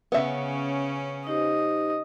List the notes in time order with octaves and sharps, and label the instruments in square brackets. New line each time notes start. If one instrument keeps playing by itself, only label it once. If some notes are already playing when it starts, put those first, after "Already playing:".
[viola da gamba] C#3 C#4 [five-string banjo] B3 E5
[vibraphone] D#4 G4 C5 [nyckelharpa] D#5